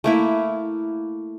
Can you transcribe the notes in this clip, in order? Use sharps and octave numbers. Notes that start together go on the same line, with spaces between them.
A3 A#3 E4